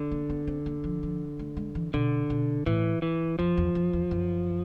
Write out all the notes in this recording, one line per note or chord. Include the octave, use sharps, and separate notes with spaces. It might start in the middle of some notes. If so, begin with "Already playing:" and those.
Already playing: D3
A#3
B3
C4
A#3
F3
F3
A3
G#3
E3
B2 D3
B2
A2 E3
E3
F2 F3
E2
F2
E2
F#2